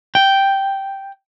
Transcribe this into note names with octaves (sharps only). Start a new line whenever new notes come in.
G5